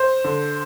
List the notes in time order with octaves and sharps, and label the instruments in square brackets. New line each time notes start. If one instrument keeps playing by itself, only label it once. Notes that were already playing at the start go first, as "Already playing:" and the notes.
Already playing: [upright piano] C5
D3